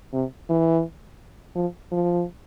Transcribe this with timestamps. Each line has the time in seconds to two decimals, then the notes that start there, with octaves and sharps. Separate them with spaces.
0.13 C3
0.50 E3
1.55 F3
1.92 F3